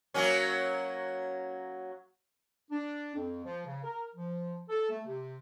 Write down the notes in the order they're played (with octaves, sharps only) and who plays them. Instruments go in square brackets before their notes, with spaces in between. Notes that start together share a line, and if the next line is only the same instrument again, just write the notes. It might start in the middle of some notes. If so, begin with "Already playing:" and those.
[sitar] F#3 A#3 C#4
[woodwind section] D4
F2
F3
C#3
A#4
F3
A4
A3
C3